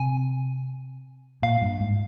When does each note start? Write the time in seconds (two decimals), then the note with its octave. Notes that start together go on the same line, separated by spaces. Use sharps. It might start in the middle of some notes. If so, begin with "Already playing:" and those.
Already playing: C3 G#5
1.42 A#2 F5
1.62 G2
1.80 G#2